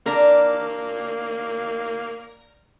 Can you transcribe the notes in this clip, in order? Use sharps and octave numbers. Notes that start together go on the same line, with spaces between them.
A#3 D4 A#4